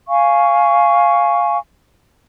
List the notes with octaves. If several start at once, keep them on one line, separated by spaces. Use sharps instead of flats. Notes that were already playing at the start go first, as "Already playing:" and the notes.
F5 G#5 C#6